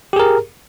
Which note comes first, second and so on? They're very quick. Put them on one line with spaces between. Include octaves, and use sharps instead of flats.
G4 G#4 A#4